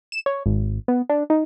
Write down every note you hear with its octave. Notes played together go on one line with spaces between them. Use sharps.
E7
C#5
G#1
B3
D4
D#4